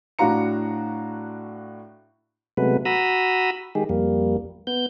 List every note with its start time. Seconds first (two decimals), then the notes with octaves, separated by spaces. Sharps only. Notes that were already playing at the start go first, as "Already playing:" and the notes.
0.19 A2 D4 F#4 F5 A#5 C#7
2.57 C3 F#3 G#3 A3 B3 B4
2.85 F#4 A#5 B5 D#6 E6
3.75 D#3 G#3 G4 G#4
3.89 F2 G3 A#3
4.67 B3 G6